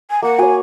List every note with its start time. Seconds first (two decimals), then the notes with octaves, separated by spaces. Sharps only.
0.10 G#5
0.23 A#3 F#5
0.39 F#4 C#5 G#5